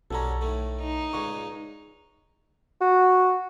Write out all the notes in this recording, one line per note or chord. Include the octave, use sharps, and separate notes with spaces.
B1 F#2 G3 C#4 A4 A#5
A2 D#3 A3
D#4
C#2 A#2 G#3 C#6
F#4